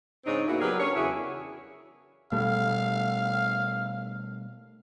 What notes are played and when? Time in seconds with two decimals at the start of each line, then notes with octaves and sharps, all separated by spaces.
0.26 G#2 C#3 C4 D4 D#4 C#5
0.47 A#3 B3 E4 F#4
0.61 F#3 G4 G#4 A#4 B4 D5
0.79 C#4 D4 A#4 C#5
0.96 E2 C#3 E4 F#4 G#4
2.32 B2 G3 A3 F5